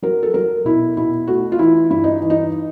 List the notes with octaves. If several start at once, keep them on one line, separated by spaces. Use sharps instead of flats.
F#3 A#4
A4
F#3 A#4
B2 E4
B2 E4
A3 F#4
F4
E3 E4
G2 E4
D#4
E3
D#4